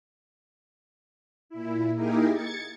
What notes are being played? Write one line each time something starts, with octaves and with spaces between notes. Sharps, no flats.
A#2 E4
A#3 D#4 E4 G4 G#4 A#4
G#6 A6 C#7